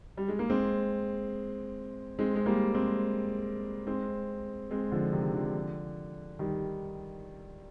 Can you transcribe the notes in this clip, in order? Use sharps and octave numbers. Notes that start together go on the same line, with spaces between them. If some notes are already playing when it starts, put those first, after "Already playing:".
G3
G#3
A#3
G#3 C4
G#3 C4
G#3
G3 A#3
G#3 C4
G#3 C4
G#3 C4
D3 F3
C3 D#3
D3 F3
D#3 G3